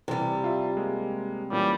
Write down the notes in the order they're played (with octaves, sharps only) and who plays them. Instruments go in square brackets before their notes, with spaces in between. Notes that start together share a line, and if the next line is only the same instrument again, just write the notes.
[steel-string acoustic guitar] C3 G3 [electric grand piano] E3
[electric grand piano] F4 E5
G#3 A#3
[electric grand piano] A#2 E3 C#4 [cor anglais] G3